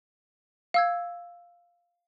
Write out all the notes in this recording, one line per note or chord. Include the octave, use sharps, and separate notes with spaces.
F5 E6 G#6